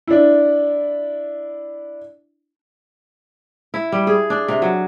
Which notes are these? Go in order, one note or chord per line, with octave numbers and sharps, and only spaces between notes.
D4 E4
E4
G3
G#4
D4
C3
F#3